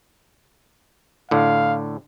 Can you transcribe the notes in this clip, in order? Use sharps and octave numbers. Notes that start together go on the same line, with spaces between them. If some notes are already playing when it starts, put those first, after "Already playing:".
A2 D3 F5